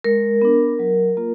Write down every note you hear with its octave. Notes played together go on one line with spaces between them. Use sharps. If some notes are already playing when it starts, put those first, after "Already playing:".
G#3 A#4
B3 D4
F#3
A#3 F4